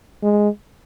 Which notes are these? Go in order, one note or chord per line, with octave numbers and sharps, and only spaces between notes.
G#3